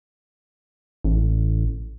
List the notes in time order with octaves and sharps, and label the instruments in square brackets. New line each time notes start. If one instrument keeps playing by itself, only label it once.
[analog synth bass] A1